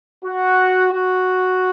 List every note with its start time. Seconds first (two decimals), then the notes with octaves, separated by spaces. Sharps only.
0.24 F#4
0.92 F#4